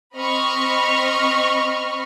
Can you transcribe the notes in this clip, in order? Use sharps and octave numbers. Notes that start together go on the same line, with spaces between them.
C4 D#5 B5 C#6 F6